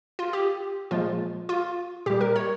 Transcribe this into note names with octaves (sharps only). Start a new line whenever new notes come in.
F4
G4
A#2 F3 G#3 F4
F4
A#2 G3 G4
A#4
C#5